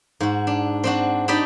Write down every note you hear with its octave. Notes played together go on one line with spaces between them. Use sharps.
G#2 F#4
D4
C4 D4 F#4
D4 D#4 G4 D5 B5